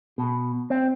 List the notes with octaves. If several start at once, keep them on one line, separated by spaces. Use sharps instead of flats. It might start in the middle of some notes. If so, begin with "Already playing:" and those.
B2
C4